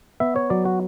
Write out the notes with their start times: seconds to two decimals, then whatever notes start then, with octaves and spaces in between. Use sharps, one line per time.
0.20 B3 E5
0.36 C#5
0.50 F#3 D5
0.65 F#4